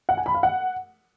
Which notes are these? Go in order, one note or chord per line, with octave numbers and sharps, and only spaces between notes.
F#5
G#5
B5
F5
F#5